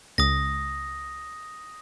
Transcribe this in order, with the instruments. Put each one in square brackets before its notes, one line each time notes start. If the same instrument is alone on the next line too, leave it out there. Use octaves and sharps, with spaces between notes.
[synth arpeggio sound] C#2 [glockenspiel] D#6 A#6